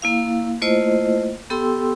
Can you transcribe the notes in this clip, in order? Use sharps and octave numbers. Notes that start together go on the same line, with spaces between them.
A#3 E4 F5
A3 A#3 E4 F4 C5 D#5
B3 G4 A4 G5 C6 E6